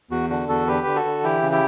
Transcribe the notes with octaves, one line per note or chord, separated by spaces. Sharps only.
E2 F#4
D3 F#4
E2 F#4 A4
D3 G4 B4
D3
F#4 A4
D3
E3 E4 G4
C#3
E4 G4